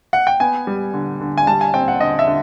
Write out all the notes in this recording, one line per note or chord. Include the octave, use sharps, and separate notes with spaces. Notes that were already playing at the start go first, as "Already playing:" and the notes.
F#5
G5
B3 G#5
G3
D3
D3
G#5
G3 A5
G#5
C4 G5
F#5
D3 D#5
E5
D3